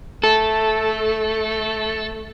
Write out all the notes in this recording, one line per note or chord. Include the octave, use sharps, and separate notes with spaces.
A3 A4